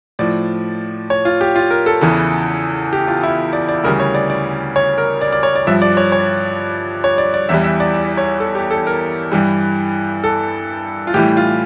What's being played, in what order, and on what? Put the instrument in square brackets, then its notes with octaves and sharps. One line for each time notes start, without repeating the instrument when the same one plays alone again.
[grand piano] A2 F3 D5
C#5
F4
G4
F4
A#4
A4
E2 C#3 E3
G4
F4
E4
D5
D5
D2 C#3 E3 G3 A#4
C#5
D5
D5
C#5
A#4
D5
D5
C#5
D5
G2 F3 E5
D5
C#5
C#5
C#5
D5
D5
E2 E3 G3 E5
E5
D5
D5
C#5
A4
G4
A4
A#4
G2 E3 G3
A4
F4
A2 E3 G3 G4
F4